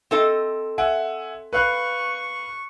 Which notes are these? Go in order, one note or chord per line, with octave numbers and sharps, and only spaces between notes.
C4 A4 D#5
E5 F#5 G#5
B4 F5 C#6 F#6